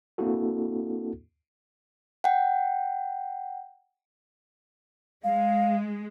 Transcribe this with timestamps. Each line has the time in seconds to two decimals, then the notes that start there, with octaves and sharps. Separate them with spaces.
0.18 A#3 C4 D4 E4 F#4 A4
2.24 F#5 G5
5.24 G#3 F5